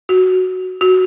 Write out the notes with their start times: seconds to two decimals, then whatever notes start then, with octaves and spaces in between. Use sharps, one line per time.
0.09 F#4
0.81 F#4